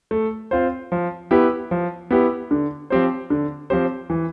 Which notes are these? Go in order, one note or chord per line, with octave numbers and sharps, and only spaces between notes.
A3
C4 F4 C5
F3
B3 E4 G4 B4
F3
B3 E4 G4 B4
D3
F3 C4 G4 C5
D3
F3 C4 G4 C5
E3